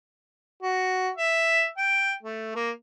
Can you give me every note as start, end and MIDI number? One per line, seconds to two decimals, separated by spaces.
0.63 1.09 66
1.17 1.67 76
1.78 2.13 79
2.23 2.51 57
2.56 2.71 58